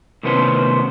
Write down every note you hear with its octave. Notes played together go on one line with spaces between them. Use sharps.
A2 C3 D#3 B3 C#4 C5